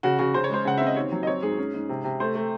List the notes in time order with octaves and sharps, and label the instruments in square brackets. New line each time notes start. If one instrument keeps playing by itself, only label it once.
[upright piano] C#3 F#4
C#3 F#4
C#3 C5
C#5
G#3 C5
C#3 F#5
C4 E5
D#5
D#2 C#5
F#3
D#5
C4 C#5
G#2 G#4
C#4
G#2
C3
C3
A3 C5
A3